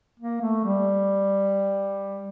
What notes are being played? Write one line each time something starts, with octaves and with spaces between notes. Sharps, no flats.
A#3
A3
G3